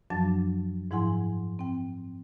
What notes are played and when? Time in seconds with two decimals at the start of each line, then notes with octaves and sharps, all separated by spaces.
0.10 F#2 F3 F#3 D4 A5 A6
0.91 G#2 F3 E4 F#5 G#5 C6
1.59 C4 G5